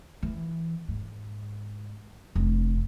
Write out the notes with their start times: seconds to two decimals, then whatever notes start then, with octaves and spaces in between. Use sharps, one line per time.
0.23 E3
0.88 G#2
2.35 F1 D4